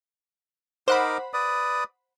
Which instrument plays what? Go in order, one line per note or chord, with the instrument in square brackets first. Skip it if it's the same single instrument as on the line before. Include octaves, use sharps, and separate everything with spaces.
[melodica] D#4 A#4 D6 [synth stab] C5 F#5 B5
[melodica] B4 D5 D#6